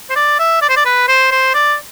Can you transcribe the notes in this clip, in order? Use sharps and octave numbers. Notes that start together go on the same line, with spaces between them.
C5
D5
E5
D5
C5
D5
B4
C5
C5
D5